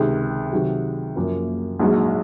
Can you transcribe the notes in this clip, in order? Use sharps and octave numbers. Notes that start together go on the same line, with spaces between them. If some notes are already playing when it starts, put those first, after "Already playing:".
Already playing: C#2 C3 D#3
C3 D#3 F#3
F#1 F#2 F3 A#3
A#1 G#2 F#3